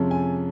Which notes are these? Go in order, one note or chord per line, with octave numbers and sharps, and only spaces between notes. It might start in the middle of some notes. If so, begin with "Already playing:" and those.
Already playing: F2 C3 F3 G#3 C#4
G#5